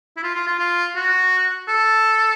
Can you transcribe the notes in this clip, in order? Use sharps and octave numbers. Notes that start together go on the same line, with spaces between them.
E4
F4
F4
F4
F4
F#4
A4